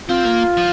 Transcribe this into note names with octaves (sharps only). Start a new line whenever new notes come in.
C4 F4
A#3
F3